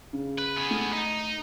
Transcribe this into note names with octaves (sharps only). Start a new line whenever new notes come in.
C#3
B4
B3 G#4
A3
D#4